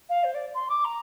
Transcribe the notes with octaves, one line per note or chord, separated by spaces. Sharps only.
F5
C5
D5
C6
D6
A#5